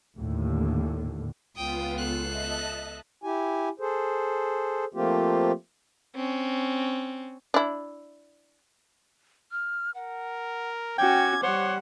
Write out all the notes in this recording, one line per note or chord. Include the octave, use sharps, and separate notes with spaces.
D#2 A2 D3
C#2 B3 F4 G5 D#6
A4 F#6 C7
D#5 E5 A5
E4 G4 G#5
G#4 A4 C5
F3 A3 A#3 C4 F4 G4
C4 C#4
D4 E4
F6
A#4 F#5
C#4 F#4 G5 D6 G#6
G3 C5 C#5 F#5